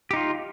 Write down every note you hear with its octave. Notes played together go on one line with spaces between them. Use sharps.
D#4 F4 G4